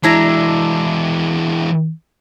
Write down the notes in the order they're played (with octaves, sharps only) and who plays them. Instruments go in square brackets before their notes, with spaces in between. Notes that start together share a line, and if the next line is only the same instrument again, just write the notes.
[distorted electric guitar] E3 G#3 [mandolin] D4 E4 A#5